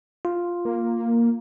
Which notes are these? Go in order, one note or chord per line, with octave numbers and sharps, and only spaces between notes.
F4
A#3